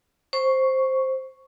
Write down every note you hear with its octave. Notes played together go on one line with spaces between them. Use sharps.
C5 C#6